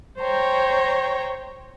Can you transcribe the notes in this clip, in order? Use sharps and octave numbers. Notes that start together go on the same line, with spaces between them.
C5 C#5 G5 A#5